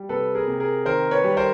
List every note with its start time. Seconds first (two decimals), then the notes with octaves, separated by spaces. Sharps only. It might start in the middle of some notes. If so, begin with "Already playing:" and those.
Already playing: G3
0.09 C3 A4 B4
0.35 G#4 A#4
0.48 C3
0.60 G#4 A#4
0.86 D#3 A#4 C5
1.11 B4 C#5
1.24 G3
1.37 A#4 C5